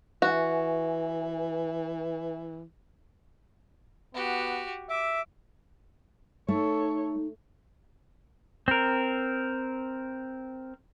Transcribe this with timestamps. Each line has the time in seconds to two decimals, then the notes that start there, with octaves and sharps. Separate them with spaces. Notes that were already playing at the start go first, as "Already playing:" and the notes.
0.22 E3 F#4 B4 E5 G#5
4.14 B3 F#4 G4
4.89 E5 D6
6.48 A3 D#4 A4 C#5
8.68 C4 A#4